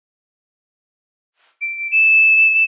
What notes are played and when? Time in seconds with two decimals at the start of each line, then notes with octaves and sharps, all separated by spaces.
1.61 D7
1.91 E7